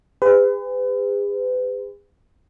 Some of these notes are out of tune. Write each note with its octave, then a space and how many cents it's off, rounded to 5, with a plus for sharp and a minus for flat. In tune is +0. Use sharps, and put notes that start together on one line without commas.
G#4 -45 B4 +35